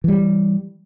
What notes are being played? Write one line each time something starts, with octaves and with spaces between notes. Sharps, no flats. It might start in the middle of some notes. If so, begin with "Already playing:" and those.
E3 G3